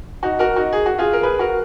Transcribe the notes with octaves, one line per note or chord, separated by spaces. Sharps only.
D#4 F#4
F#4 A#4
D#4 F#4
G#4
F#4
F4 G#4
A#4
G#4 B4
F#4 A#4